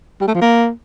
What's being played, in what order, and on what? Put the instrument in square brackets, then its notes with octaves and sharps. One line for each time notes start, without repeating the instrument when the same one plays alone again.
[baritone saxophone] G3
A3
F3
A#3